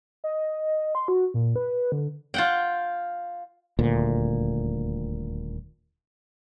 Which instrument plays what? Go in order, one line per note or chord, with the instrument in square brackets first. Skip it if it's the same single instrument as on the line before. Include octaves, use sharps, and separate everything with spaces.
[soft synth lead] D#5
C6
F#4
A#2
B4
D3
[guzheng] F4 F#5 G5
[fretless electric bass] D#1 D2 A#2